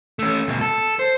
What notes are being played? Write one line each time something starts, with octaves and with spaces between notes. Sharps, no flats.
A3 C#4
D2 B2
A4
C5